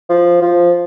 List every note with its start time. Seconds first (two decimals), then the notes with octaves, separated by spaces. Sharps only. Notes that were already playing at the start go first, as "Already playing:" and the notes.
0.10 F3
0.42 F3